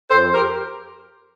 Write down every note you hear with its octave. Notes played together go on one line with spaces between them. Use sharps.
F2 A4 C5
G4 A#4